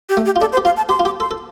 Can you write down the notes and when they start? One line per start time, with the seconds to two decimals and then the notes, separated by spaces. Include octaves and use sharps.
0.09 G4
0.17 A3
0.26 G4
0.36 F4
0.40 D4 A4
0.53 C5
0.57 G4
0.65 F4 F5
0.77 A5
0.89 G4 C6
0.99 F4
1.05 G4 D6
1.20 A4 C6
1.31 A4